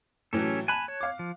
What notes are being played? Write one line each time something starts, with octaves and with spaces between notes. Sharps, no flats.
A2 E3 F#3 C#4 G4 A4
G#5 A5 B5 F#6
C#5
F5 D6
F3